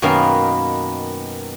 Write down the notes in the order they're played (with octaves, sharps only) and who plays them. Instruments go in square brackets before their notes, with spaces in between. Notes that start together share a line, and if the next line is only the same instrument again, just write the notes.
[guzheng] F#2 B2 D#3 A#3 B3 F5